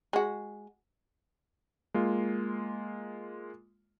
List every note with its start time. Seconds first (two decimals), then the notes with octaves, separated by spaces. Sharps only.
0.13 G#3 F#4
1.94 G#3 A#3 F4